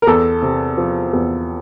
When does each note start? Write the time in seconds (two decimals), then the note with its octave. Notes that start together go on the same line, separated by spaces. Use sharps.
0.02 A#4
0.07 E2 A4
0.42 C3
0.77 F3
1.13 E2